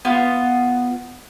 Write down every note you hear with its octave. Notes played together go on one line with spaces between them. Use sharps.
B3 F4